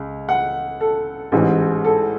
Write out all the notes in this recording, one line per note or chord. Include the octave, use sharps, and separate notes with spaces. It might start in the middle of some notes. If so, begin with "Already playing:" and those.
Already playing: C#2
F#5
A4
A1 G#2 E3
A4